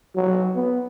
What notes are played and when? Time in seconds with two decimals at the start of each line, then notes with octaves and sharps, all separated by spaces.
0.15 F#3
0.55 B3